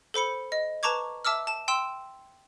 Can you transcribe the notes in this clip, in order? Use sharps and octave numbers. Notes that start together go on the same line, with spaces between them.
A4 C5 B5 C#7
D#5
B4 A5 A#5 C#6 D6 G#6
E5 A5 D6 E6 F6
A5 E7
G5 C6 E6 E7